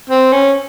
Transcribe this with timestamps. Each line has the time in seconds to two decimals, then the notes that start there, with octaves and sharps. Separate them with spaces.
0.10 C4
0.32 C#4